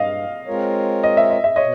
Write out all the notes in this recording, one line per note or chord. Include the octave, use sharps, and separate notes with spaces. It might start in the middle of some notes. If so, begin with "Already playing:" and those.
Already playing: G2 D#5 F5
G#3 C4 F4 A#4 C#5
D#5
E5
D#5
E5
B2 C#5 D#5